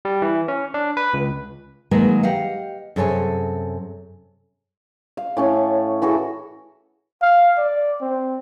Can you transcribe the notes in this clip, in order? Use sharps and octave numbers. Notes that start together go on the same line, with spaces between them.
G3
E3
C#4
D4
B4
C#2
D#3 F#3 G#3 A#3 A#4 B4
G4 D#5 F5 F#5
F#2 C3 G#4 A4 C#5 G#5
F5
A2 C#4 A4
E3 F#4 G#4 A4
F5
D5
C4